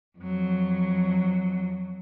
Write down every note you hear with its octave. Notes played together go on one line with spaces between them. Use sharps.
F2 F#3